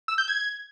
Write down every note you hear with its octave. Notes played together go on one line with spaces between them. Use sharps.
E6
G6
G#6